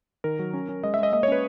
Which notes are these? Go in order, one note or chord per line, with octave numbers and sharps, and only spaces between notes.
D#3 A#4
F#3
C#4
C#4
G#3 D#5
E5
G#3 D#5
A#3 D#5
C#5
C#4 B4